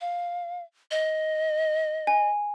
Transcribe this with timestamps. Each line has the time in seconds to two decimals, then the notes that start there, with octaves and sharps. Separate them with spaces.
0.01 F5
0.91 D#5
2.07 G#5